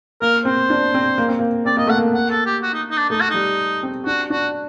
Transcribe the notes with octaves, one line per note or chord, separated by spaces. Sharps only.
A#3 A#4
C4 C5
D4
C4
A#3
C4
A#3
C4 D5
A#3 D#5
A3 F#5
A#3
F#5
A4
G4
F#4
D#4
D#4
D4
A3 D#4
F#4
G3 D#4
C4
D4 F#4
D4 F#4